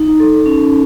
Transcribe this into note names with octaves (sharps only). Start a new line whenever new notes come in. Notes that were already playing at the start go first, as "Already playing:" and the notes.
Already playing: D#4
A4
C#4